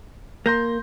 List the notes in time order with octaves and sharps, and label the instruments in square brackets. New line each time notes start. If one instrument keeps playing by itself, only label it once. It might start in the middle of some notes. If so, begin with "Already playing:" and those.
[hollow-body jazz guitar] A#3 [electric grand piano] C6 G6 A#6